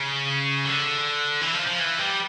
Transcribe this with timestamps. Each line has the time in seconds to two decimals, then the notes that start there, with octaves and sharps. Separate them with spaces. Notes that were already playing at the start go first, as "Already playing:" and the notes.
Already playing: C#3
0.65 D3
1.41 E3
1.54 F3
1.66 F3
1.79 E3
1.98 G3